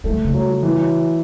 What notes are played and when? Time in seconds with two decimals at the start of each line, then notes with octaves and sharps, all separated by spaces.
0.04 G#3 A3
0.14 C#3
0.24 C#3
0.34 F#3
0.48 F#3
0.63 E3
0.75 F#3